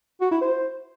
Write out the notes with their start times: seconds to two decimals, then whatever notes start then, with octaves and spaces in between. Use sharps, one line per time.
0.21 F#4
0.31 E4
0.41 C5